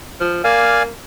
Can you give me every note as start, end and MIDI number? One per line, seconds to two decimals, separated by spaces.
0.21 0.40 53
0.44 0.91 58
0.44 0.83 74
0.44 0.83 77
0.44 0.83 80